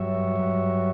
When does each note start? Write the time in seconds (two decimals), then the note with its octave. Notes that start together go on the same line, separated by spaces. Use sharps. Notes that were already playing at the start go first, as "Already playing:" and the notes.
Already playing: G2 F#3 C#5 E5
0.36 G2 F#3